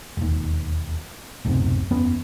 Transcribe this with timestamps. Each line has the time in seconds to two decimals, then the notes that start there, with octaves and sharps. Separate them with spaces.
0.17 E1 D#2
1.45 D1 B1 F#2 C3
1.91 F#1 E2 B3 C#4